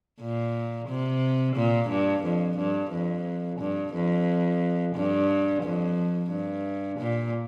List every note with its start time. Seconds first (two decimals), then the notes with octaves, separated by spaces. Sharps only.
0.21 A#2
0.88 C3
1.56 A#2
1.89 G2
2.24 F2
2.58 G2
2.91 F2
3.60 G2
3.94 F2
4.95 G2
5.63 F2
6.31 G2
6.99 A#2